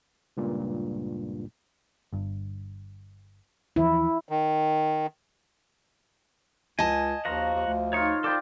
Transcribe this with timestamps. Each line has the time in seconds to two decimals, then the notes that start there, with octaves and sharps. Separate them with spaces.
0.37 C#2 G2 A#2
2.13 G1 G2
3.76 D#2 E3 F3 E4
4.29 D#3
6.79 C#2 D#5 G#5 A5
7.25 D#2 F3 F#4 A#5
7.54 D#2
7.67 D2
7.93 D#4 F4 C#5 C#6
8.24 A4 C5 D5 G5 B5